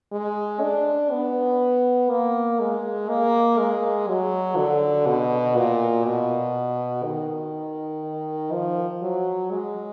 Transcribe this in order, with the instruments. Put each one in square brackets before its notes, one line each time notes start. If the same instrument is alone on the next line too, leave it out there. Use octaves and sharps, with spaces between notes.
[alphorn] G#3
D4
B3
A#3
G#3
A#3
G#3
F#3
D3
B2
A#2
B2
D#3
F3
F#3
G#3